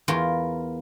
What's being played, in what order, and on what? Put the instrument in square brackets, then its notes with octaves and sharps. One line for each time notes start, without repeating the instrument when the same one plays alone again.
[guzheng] E2 F4 A#4